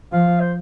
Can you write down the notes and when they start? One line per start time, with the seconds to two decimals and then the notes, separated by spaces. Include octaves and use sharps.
0.12 F3 F5
0.40 C5